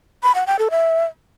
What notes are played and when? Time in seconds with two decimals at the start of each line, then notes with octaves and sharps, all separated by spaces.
0.23 B5
0.35 F#5
0.47 G5
0.59 A4
0.71 E5